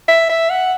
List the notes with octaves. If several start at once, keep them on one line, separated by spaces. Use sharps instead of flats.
E5
E5
F#5